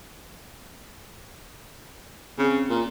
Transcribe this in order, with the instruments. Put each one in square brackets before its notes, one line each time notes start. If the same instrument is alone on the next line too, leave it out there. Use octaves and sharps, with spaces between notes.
[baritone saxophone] C#3 [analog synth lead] C4
[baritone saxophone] A#2